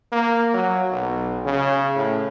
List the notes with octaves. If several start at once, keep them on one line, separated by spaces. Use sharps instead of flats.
A#3
F#3
B1
C#3
A2